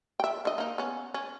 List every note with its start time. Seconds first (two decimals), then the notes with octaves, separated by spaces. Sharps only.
0.20 E5 G5
0.45 D3 D#5
0.58 A#3 D#4
0.78 B3 C#4
1.14 C#4